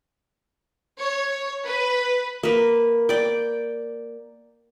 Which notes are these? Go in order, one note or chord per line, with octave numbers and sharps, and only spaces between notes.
C#5
B4
A#3 B4
D5 G5